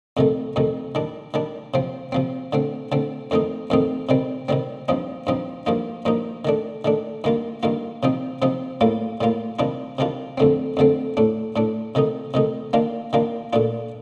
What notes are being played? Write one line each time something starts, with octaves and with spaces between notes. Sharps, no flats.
F2 C3 D#3 A3
F2 C3 D#3 A3
D#3 G3 D4
D#3 G3 D4
C3 F3 C4
C3 F3 C4
D3 A3 C4
D3 A3 C4
F2 D#3 A3 C4 D#4
F2 D#3 A3 C4 D#4
C3 D#3 G3 C4
C3 D#3 G3 C4
G2 F3 C4 D#4
G2 F3 C4 D#4
G2 F3 A#3 D#4
G2 F3 A#3 D#4
D#3 A3 D4
D#3 A3 D4
G2 D#3 A#3 F4
G2 D#3 A#3 F4
C3 F3 C4 D#4
C3 F3 C4 D#4
A2 G3 A#3 F4
A2 G3 A#3 F4
C3 D#3 G3 D4 F4
C3 D#3 G3 D4 F4
F2 D3 A3 C4
F2 D3 A3 C4
A2 A3 D4
A2 A3 D4
C3 D#3 A3 D#4
C3 D#3 A3 D#4
D#3 A#3 D4 F4
D#3 A#3 D4 F4
A#2 A3 D4 F4